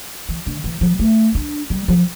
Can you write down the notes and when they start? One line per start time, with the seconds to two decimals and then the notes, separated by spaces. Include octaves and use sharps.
0.29 E3
0.46 D3
0.64 E3
0.81 F3
0.99 A3
1.35 D4
1.70 G3
1.88 F3